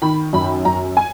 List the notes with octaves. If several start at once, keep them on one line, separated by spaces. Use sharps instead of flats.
D#3 B5
F#2 B5
F#2 A#5
G#5